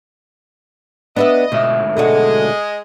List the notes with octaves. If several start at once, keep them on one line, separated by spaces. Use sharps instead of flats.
B3 D4 B4 D#5 E5
D2 G#2 B2 E5
B2 D3 G#3 F#4 A4 D#5